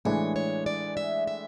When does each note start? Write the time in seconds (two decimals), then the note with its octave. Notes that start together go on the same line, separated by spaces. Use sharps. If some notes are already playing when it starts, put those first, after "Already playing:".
0.05 A2 E3 G#3 D4 G#4 C#5
0.36 C#5
0.66 D5
0.97 E5
1.27 E5